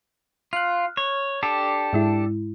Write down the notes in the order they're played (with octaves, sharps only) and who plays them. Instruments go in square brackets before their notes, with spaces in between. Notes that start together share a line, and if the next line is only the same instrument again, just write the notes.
[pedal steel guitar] F4 [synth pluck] F6 F#6
[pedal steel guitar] C#5
D4 G4 A4
[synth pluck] G#2 G#3 E4